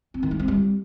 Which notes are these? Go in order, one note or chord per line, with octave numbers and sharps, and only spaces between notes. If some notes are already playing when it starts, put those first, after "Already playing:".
C4
D#3
G#3
C4
G3